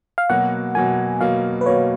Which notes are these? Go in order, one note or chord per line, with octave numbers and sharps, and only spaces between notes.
F5
B2 F#3 A#3 F#5
B2 F#3 A#3 G#5
B2 F#3 A#3 F5
B4
B2 F#3 A#3 C#5